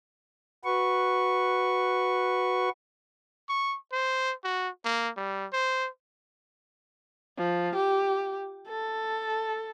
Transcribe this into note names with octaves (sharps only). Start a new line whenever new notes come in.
F#4 B4 C#6
C#6
C5
F#4
A#3
G3
C5
F3
G4
A4